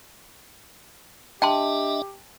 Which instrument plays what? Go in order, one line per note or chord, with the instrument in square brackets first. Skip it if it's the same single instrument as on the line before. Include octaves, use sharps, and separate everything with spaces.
[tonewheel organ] D4 D#5 E5 [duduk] G4 [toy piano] G5 A5 C6